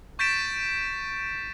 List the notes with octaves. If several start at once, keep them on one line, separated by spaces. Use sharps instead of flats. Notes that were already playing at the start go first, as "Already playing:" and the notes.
C#6 G6 A6 B6 D7 E7